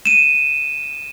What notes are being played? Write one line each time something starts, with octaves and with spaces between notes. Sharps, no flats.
D#7 E7